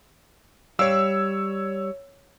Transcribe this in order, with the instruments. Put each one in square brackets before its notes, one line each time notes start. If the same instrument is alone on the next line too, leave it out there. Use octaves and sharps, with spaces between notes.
[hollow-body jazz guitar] G3 D5 F5 [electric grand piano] C#5 E6